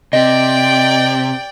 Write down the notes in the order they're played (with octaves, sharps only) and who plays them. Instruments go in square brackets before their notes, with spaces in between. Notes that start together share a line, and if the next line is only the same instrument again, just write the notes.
[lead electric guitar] C3 [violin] D5 G5 [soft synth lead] D#5